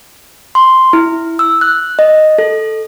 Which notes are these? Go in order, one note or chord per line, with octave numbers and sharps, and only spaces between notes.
C6
E4
E6
F#6
D#5
A4